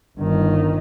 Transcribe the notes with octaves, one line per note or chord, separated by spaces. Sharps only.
G1 D#3